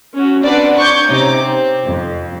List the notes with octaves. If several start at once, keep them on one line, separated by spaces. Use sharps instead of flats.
C#4 F#4
C4 D4 B4 D5 F#5
C#6 D6 G6 G#6
C3 C#4 D#4 D6
C4
F2